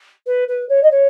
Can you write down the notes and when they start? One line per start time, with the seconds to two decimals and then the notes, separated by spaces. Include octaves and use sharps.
0.26 B4
0.48 B4
0.69 C#5
0.83 D#5
0.91 C#5